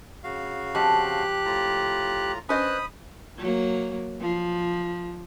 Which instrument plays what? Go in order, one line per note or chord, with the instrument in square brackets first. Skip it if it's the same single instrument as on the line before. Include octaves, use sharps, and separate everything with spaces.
[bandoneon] C#3 F#4 F5
[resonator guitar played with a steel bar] F2 [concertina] G4 F#6
[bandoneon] A2 F4 A#5
[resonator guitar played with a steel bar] C#4 C5 D#5 [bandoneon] B4 F#6 [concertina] B5 D#6
[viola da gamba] F#3 A#3
F3